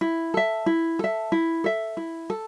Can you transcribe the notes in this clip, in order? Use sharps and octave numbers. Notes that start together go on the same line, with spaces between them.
E4
A4 E5
E4
A4 E5
E4
A4 E5
E4
A4